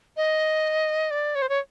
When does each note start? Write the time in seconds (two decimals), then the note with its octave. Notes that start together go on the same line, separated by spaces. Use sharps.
0.17 D#5
1.11 D5
1.35 C#5
1.42 C5
1.49 C#5